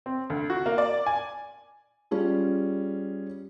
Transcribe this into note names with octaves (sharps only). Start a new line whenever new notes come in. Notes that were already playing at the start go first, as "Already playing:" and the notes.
C4
D2
F#4
A#3
D5
G#5
G3 C#4 F4 G#4